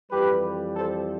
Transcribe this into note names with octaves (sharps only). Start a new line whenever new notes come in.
F2 E3 G3 G4 B4
A4 C5